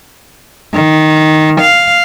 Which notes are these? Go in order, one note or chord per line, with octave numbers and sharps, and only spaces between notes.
D#3
F5